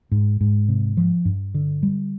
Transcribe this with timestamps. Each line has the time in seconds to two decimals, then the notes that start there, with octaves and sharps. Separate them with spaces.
0.11 G#2
0.41 G#2
0.69 C3
0.97 F3
1.25 G2
1.54 D3
1.83 G3